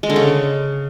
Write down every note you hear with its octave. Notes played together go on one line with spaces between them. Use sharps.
G#3
D3
C#3